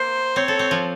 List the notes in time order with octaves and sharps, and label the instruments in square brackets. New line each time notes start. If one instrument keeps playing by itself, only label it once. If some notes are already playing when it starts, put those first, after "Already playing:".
Already playing: [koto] A#3 [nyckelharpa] C5
[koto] C4 [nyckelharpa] C#5
[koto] A4
C4
F3